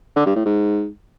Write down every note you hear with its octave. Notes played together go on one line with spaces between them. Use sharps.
D3
G2
A2
G#2